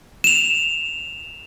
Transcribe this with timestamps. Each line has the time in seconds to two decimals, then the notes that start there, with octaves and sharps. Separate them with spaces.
0.24 E7 F7